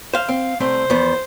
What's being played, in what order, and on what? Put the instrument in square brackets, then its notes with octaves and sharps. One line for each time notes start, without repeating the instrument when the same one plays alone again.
[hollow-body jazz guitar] C5 F5
[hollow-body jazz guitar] C4 [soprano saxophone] F5
[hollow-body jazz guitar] C2 A3 C4 [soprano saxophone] C5
[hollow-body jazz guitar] E2 F3 B3